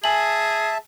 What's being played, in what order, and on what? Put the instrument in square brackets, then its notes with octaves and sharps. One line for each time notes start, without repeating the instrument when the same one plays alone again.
[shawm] G#4 [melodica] E5 A5 [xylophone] G#5 F#7